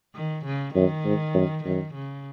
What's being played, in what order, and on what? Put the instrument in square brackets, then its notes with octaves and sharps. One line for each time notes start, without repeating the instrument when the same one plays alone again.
[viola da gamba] D#3
C#3
[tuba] F#2 [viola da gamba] D#3
[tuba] G#2
F#2
[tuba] F#2 [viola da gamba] D#3
[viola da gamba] C#3